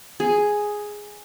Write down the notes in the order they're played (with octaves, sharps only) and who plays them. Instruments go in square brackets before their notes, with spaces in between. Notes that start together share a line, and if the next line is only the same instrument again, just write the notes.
[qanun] G#4